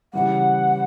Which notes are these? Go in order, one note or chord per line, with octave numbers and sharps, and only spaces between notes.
C#3 E3 G3 F#5